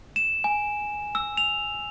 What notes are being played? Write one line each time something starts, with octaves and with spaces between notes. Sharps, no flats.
E7
G#5
E6
F7